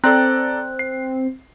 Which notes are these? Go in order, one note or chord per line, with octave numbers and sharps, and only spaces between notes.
C4 A4 D5 A#5 F#6
C7